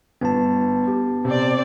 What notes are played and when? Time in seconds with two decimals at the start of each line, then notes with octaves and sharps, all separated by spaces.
0.21 G1 B3 A5
0.87 G4
1.25 C3 C4 D5